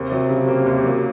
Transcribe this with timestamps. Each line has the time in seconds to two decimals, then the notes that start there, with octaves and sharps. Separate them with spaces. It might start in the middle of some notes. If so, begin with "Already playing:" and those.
Already playing: D#2 C3
0.12 F#3
0.29 C#3
0.48 A#3
0.66 D#2
0.84 F#3